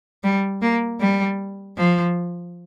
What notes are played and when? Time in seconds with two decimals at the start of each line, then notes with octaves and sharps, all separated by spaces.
0.24 G3
0.62 A#3
1.00 G3
1.77 F3